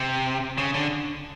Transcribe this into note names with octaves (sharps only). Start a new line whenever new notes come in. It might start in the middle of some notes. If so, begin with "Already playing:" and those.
Already playing: C3
C#3
D3